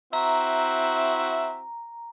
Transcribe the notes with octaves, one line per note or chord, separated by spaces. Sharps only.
C4 E4 F#4 E5 A#5